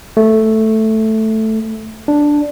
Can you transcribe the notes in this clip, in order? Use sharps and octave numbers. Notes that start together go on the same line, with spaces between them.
A3
D4